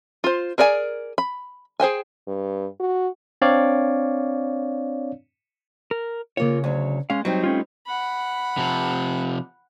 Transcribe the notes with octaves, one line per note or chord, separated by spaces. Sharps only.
F4 C5
G#4 A#4 D5 D#5 G#5
B5
G#4 C5 G5 G#5
G2
F#4
C4 D4 C#5 D5 F5
A#4
C#3 A#3 F4 C#5
D2 F#3
G#3 C#4 F5
F#3 G3 C4 D#4
A3 C#4 F4
F#5 B5
C3 F3